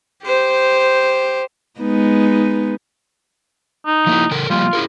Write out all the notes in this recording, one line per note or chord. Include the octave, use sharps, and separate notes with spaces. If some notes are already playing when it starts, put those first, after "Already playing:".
G4 C5
G#3 B3 D#4
D#4
F3 A#3 E4
C#3 A4 A#4
F3 G3 A#3 F4
E4 G#4 A#4